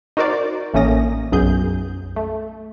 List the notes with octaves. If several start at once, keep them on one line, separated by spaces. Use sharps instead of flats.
D#4 F#4 A#4 C5 D5
A1 A3 A#3 C#4 D#6 A#6
B1 F#2 G#4 G6
A3